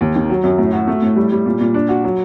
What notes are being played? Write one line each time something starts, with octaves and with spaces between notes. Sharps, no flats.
D#2
D#3
F#3
F#2
A2
F#4
A3
A2
G3
G3
A#2
A#2
D4
F#4
F#3